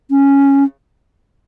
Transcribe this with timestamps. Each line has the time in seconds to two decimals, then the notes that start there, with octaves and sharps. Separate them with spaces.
0.11 C#4